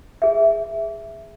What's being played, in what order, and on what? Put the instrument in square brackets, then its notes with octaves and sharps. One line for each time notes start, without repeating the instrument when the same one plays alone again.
[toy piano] G#4 E5